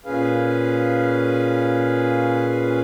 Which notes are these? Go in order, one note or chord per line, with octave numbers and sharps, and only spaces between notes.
A#2 C#4 G#4 B4 F5